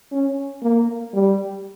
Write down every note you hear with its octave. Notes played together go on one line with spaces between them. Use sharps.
C#4
A#3
G3